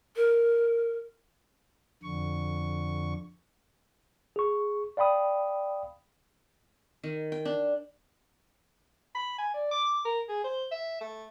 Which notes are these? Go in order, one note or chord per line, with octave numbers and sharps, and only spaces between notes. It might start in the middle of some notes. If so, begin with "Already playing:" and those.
A#4
F2 D3 C#6
G#4 C#6
D5 F5 G5 B5 D#6
D#3
G5
D4
B5
G#5
D5
D6
A#4
G#4
C5
E5
A3